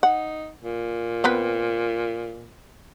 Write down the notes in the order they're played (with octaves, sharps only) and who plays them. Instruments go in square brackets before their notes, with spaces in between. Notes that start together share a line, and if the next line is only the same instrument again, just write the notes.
[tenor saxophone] D#4 [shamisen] F#5
[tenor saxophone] A#2
[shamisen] B3 C4 B4